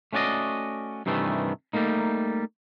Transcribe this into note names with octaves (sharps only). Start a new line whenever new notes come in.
A3 C#4 F#4 D5 D#5
G2 C3 D#3 E3 A3
G3 A3 A#3 D#4